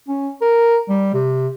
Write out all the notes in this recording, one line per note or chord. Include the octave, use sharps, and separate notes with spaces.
C#4
A#4
G3
C3